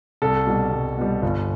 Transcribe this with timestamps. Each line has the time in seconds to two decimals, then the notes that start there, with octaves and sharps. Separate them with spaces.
0.22 C2 A4
0.47 B2 G3
0.72 C2
0.97 B2 G3
1.22 G1